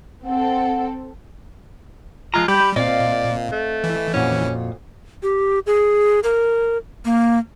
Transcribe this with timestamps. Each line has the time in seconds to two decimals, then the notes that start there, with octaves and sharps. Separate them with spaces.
0.25 C4 A4 F#5
2.34 F3 G#3 F4 A#5
2.48 G3 G4 B5 G6
2.76 A#2 C4 D5 D#5 F5
3.52 A3
3.84 E3
4.14 F2 A#2 C#4 F#4
5.23 G4
5.66 G#4
6.23 A#4
7.05 A#3